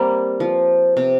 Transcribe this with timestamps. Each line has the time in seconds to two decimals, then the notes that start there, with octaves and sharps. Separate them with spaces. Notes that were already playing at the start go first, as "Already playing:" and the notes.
Already playing: G3 A#3 C4
0.40 F3
0.97 C3